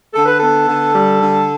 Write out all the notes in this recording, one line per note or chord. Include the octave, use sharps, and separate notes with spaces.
D3 A4
B4
B3 A4
D3
G3
D3